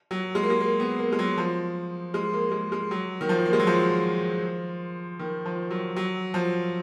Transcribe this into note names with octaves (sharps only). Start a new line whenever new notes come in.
F#3
G#3
A#3
G#3
A#3
B3
A#3
G#3
F#3
F3
G#3
A#3
G#3
G#3
F#3
D#3
F3
A#3
G#3
F#3
F3
D#3
F3
F#3
F#3
F3